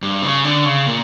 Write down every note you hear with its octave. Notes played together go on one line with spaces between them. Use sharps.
G2
C#3
D3
C#3
A#2